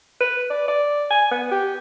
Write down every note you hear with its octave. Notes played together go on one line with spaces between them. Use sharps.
B4
D5
D5
G#5
B3
G4